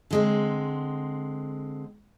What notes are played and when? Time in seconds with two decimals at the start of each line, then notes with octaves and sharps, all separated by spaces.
0.11 D3 G#3 C4